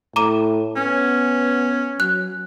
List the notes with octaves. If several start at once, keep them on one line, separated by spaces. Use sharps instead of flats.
A2 A#5 D6 D#7
B3 C#4
F#3 F#6